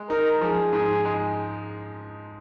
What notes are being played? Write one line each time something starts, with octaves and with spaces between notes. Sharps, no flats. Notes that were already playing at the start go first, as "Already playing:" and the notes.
Already playing: G#3
D#4 A#4
F3 G#4
G#2
G#3